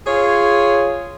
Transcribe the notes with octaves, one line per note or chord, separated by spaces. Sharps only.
F4 G#4 C#5